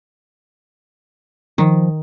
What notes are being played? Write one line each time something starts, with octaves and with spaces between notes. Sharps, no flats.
D#3 F3